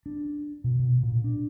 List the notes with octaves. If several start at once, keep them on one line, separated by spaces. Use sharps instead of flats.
D4
B2
B2
A#2
D4